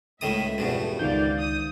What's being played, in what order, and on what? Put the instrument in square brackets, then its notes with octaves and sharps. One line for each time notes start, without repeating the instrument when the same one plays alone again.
[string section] C#2 E5 [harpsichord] A2 D#3 D#6
[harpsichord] E2 G2 F3 [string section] B2 A3
[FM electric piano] C#2 D#3 G6 [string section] D5 F5
[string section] D#6